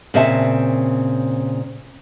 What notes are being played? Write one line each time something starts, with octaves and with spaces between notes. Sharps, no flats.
A#2 C#3 C4 E5 A5